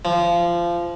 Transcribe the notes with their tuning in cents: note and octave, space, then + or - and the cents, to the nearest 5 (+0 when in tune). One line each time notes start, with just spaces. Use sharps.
F3 -20